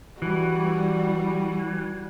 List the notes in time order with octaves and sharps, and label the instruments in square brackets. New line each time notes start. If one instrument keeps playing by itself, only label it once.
[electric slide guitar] E3 [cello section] G3 [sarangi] F#4